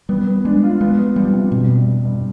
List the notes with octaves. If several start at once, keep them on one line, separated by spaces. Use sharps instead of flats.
G3 B3
B3
G#3 D4
F4
G#3 B3
B3
F3 G3
C3
G2 B2
G2
G2
G2